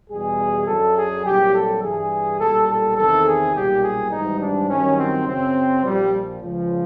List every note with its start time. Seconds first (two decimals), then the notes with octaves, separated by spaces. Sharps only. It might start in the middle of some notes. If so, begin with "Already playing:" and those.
0.10 E2 B2 G3 G#4
0.67 F#2 D3 F#3 A4
0.96 G#4
1.25 C2 A#2 F#3 G4
1.53 A4
1.82 G2 E3 G3 G#4
2.39 B1 A#2 G3 A4
2.68 A4
2.96 E2 C3 D#3 A4
3.26 G#4
3.54 B1 A#2 G3 G4
3.83 G#4
4.11 G#1 G#2 E3 G3 D#4
4.40 D4
4.69 G2 D#3 F#3 C#4
4.97 C4
5.27 F#2 C#3 F#3 C4
5.83 A#1 A#2 F3 G3
6.41 C#2 C#3 F3